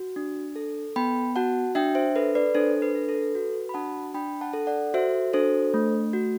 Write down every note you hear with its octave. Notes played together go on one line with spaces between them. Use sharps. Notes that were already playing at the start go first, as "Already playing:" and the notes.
Already playing: F#4
D4
A4
B3 G5 B5
F#4 F#5 A5
D4 E5 G5
C5 E5
A4 B4
B4 D5
D4 A4 C5
B4
A4
A4
B4
A4
F#4 B4
B5
D4 F#5 A5
D4 G5 B5
F#5 A5
A4
D5 F#5
F#4 C5 E5
D4 A4 C5
A3
F#4